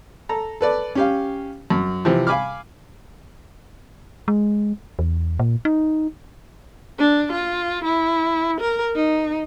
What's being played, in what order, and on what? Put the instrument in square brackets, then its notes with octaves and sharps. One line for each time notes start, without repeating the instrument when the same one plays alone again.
[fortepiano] A4 A#5
A4 B4 D5
C#4 G4 F5
F#2
C3 E3 F3
F5 G#5 B5 D6 F6
[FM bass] G#3
E2
A#2
D#4
[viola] D4
F4
E4
A#4
D#4